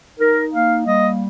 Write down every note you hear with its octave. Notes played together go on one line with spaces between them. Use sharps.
D#4 A#4
A#3 F5
G3 D#5